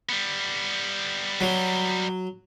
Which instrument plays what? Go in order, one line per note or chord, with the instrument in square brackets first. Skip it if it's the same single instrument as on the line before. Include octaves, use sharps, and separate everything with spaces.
[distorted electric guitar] G3 B3
[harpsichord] F#3